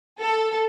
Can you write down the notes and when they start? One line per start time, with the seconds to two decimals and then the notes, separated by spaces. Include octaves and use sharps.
0.20 A4